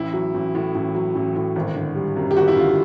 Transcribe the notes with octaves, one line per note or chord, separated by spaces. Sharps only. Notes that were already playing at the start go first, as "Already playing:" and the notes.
Already playing: A1 E4
F#3
A1
A2
A1
F#3
A1
A2
G#1
D3
G3
F#2
G4
G#1 F#4
E4
D3 F4